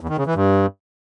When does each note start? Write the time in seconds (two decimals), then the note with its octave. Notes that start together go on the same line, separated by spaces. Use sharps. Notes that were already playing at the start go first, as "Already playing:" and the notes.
0.01 E2
0.09 D#3
0.18 C#3
0.26 E3
0.35 G2